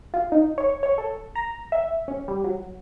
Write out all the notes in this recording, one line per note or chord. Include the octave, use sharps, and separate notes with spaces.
F4
D#4
C#5
C#5
A4
A#5
E5
C#4
G3
F#3